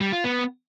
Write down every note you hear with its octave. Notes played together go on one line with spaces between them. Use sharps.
G3
F4
B3